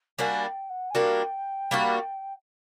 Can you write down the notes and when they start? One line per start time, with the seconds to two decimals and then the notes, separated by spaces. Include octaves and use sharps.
0.18 G3 A#3 D4 F#4 G#5
0.43 G5
0.69 F#5
0.90 G#5
0.95 G3 A#3 D4 F#4 G5
1.71 G3 A#3 D4 F#4